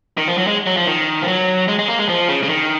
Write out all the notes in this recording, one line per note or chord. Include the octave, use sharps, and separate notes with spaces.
D#3
F3
F#3
G#3
F#3
F3
D#3
F3
F#3
G#3
G#3
A#3
G#3
F3
C#3
C#3
D#3